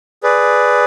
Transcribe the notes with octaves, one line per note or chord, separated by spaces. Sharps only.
G#4 B4 D5